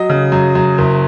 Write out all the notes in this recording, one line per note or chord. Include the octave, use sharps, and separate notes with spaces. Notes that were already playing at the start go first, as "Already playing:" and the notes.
Already playing: F#3 D#5
C#3
F#2
F#2
F#1